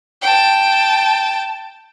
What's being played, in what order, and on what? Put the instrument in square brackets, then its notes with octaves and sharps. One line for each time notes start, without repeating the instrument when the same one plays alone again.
[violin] G5 A5